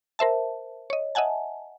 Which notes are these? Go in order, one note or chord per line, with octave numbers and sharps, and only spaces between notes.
A#4 C5 E5 A5
C#5 D#5
D#5 E5 F#5 G#5 A5